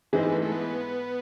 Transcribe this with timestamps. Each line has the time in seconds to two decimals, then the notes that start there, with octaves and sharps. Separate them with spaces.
0.13 G#2 E3 G#3 C4
0.23 B3
0.32 A3
0.42 A3
0.52 B3